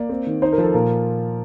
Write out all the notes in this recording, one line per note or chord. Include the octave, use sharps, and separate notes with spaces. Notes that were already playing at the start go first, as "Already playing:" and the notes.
Already playing: A#3 D5
C4
D#3
D#4 C5
A#4
F3
A4
A#2 A#4